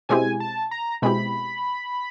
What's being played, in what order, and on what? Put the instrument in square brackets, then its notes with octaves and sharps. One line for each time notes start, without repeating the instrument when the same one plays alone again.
[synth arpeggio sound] B2 G#3 C4 E4 G4 [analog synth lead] G#5
[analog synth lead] A5
A#5
[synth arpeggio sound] B2 G#3 C4 E4 G4 [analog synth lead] B5